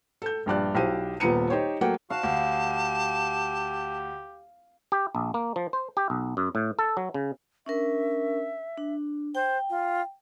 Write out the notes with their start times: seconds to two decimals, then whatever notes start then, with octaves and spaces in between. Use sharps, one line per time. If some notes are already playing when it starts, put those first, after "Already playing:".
0.22 A4 G6
0.46 A#1 G2 D5 F#6
0.75 B1 E4 G4 C5 D#7
1.20 D#1 A#2 B3 A#5 C#7 D#7
1.50 D#4 G4 C5 C#5
1.81 F#3 A3 A#3 F#5 G5
2.10 F#4 F5 A5
2.23 D2 G4
4.92 G4
5.15 A#1
5.34 A#3
5.56 F3
5.73 C5
5.97 G4
6.10 B1
6.37 F#2
6.55 A2
6.79 A4
6.97 F#3
7.14 C#3
7.66 C#4 D4 A#4 E5
8.78 D4
9.35 C5 G5
9.70 F4